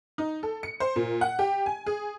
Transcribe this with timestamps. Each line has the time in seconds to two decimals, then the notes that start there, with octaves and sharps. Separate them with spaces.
0.18 D#4
0.43 A4
0.63 C#7
0.80 C5
0.96 A#2
1.21 F#5
1.39 G4
1.66 G#5
1.86 G#4